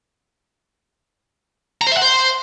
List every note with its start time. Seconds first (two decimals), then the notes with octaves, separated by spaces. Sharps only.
1.81 A#5
1.87 C5
1.92 E5
1.97 F#5
2.02 C5